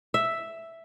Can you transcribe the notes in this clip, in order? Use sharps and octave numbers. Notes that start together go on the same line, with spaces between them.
E5